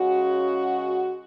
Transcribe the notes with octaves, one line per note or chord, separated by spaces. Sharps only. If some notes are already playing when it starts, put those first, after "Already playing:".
Already playing: C#3 G#3 C#4 F#4